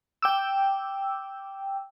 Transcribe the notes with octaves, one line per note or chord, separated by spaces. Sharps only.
G5 D6 E6